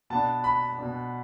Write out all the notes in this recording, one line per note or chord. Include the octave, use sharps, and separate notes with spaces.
B2 B3 D4 A5
B5
B2 B3 D4